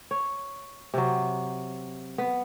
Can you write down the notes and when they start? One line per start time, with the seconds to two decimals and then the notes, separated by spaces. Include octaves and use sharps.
0.11 C#5
0.94 C3 F#3
2.18 B3